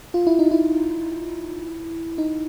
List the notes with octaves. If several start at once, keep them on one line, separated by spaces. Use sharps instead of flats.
F4
E4
D#4
E4
D#4